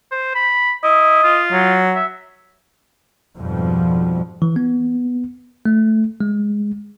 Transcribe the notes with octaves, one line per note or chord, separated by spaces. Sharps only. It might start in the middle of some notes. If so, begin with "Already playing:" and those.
C5
B5
E4 D#5
F4
F#3
E5
F2 G#2 B2 F3 G3
E3
B3
A3
G#3